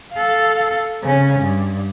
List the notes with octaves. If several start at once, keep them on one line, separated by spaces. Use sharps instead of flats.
A4 F5
C#3 C#4
G2